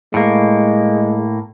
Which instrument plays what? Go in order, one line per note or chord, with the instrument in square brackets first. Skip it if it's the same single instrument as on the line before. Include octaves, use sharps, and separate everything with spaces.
[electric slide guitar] A2 A#3 [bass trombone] G#3